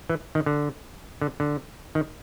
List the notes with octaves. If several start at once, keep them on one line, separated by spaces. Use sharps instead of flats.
E3
D#3
D3
D3
D3
D#3